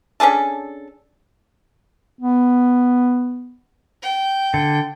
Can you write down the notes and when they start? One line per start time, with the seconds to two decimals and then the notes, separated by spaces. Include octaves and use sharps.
0.20 C#4 D4 G#4 A4
2.19 B3
4.02 G5
4.54 D3